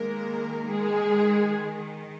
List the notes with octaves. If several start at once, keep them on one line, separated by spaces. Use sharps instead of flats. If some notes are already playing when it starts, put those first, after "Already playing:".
Already playing: D#3 G#3 A#3 A#4
G#3 G#4